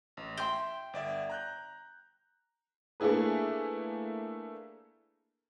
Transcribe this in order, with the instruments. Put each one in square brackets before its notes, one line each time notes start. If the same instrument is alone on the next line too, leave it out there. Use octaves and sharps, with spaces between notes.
[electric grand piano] A1
[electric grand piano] E5 [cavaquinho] G5 C6
[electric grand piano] G1 D5 E5
A#5 F#6 G6
[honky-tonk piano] A3 A#3 D4 E4 G#4 B4